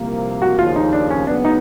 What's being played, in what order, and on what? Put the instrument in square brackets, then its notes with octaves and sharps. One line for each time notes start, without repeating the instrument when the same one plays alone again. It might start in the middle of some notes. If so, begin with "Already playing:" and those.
Already playing: [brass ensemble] C2 C3 F3 A#3
[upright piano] F#4
[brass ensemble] D#2 C#3 F3 [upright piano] F4
[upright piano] D#4
D4
C#4
[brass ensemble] D#2 C#3 F#3 B3 [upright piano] D4
[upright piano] D#4